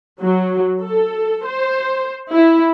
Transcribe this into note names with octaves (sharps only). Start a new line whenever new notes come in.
F#3
A4
C5
E4